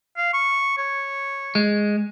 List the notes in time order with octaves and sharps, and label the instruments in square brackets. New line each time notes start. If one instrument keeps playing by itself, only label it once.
[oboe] F5
C#6
C#5
[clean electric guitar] G#3